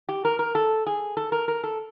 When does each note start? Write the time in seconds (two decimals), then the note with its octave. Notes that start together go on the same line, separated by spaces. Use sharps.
0.09 G4
0.25 A#4
0.39 A#4
0.55 A4
0.86 G#4
1.17 A4
1.32 A#4
1.48 A#4
1.63 A4